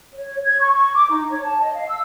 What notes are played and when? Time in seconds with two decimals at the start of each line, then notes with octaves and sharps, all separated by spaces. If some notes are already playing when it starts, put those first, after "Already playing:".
0.14 C#5
0.43 G#6
0.60 C#6
0.73 C#6
0.94 D6
1.10 D#4
1.29 C#5
1.42 A5
1.60 D#5
1.74 F5
1.88 E6